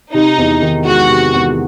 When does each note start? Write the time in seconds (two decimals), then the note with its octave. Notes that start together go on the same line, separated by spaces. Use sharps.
0.14 C3 D#4
0.38 E2
0.62 D#3
0.86 G#3 F#4
1.09 C3
1.34 E2